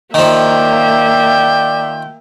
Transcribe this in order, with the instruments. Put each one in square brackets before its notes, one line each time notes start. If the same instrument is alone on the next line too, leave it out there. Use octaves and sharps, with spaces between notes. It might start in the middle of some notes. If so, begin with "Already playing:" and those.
[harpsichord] D#3 F3 [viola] A#3 E5 [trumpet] D5 [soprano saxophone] G5